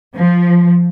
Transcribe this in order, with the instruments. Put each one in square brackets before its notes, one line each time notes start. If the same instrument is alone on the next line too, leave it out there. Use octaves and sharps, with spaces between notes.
[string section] F3